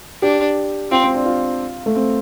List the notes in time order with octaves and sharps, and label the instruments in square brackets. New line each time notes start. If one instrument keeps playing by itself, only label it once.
[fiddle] D4 [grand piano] G4
[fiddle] C4 [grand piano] F4
[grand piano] C4
D4
F4
A3
C4